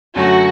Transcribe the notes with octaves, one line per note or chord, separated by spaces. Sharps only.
F#2 D3 F#3 A3 F#4